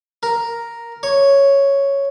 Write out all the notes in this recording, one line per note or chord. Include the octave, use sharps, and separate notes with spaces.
A#4
C#5